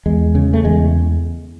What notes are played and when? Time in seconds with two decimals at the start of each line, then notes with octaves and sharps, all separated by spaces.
0.06 E2 G#3
0.35 C#3
0.54 A3
0.64 E2 G#3